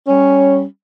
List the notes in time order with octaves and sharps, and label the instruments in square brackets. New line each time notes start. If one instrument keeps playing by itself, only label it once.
[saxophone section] G3 C#4